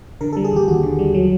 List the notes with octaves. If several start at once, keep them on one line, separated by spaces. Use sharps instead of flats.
D3 A#4
A4
G3
G#4
D#2 G4
D#2 F#4
D3
G3
F#3